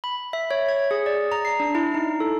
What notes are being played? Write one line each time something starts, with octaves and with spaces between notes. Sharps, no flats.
B5
E5
C#5
G#6
G#4
D5
A#5
C7
D4
E4
D#4
A4